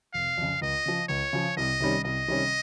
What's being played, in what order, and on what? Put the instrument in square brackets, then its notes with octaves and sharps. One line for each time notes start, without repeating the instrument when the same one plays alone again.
[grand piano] F1 [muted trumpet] F5
[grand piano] F2 C#3
[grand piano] C#2 [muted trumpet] D#5
[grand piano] C#3 F3
[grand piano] C#2 [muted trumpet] C#5
[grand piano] C#3 F3
[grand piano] C2 [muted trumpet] D#5
[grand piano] C3 D#3 G3 C#4
[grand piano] C2 [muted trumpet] D#5
[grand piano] C3 D#3 G3 C#4